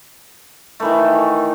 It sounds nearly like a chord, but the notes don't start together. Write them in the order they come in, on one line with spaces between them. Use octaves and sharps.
A3 E3 D#3